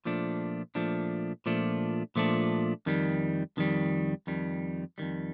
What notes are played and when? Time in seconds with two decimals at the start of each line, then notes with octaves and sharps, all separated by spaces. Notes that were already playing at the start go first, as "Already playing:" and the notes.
0.05 A#2 F3 A3 D4
0.75 A#2 F3 A3 D4
1.46 A#2 F3 A3 D4
2.16 A#2 F3 A3 D4
2.86 F2 D#3 G3
3.57 F2 D#3 G3
4.27 F2 D#3 G3
4.98 F2 D#3 G3